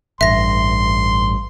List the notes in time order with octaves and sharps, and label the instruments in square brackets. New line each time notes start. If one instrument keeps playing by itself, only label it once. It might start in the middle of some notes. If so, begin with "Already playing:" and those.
[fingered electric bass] A1 G2 [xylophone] E5 A#6 [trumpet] C6